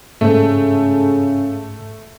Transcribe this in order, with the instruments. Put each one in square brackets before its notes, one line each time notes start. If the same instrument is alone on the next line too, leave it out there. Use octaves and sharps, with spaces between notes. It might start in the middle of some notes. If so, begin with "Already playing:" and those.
[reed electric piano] G#2 [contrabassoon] C#3 [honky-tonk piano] A3